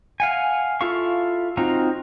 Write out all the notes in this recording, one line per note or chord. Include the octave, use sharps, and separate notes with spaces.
F5 F#5 G#5
E4 F4 A4 F5 C#6
C4 D#4 F4 F#4 A#5